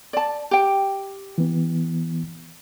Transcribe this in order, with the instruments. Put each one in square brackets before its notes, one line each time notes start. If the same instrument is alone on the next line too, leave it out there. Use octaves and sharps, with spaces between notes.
[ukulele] D5 A5
G4 G5
[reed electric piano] E3 B3